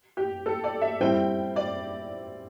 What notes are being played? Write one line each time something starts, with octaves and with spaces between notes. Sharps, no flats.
G4
A4
D5
E5
G3 C4 E4 G5
D5